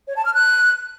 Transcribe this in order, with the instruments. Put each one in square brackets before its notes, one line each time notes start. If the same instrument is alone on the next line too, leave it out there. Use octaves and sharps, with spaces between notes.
[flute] C#5
A5
F6
F#6